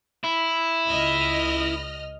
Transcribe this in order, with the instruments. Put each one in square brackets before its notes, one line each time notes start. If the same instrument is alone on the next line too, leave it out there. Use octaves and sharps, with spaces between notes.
[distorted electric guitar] E4
[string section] C#2 D#5 F6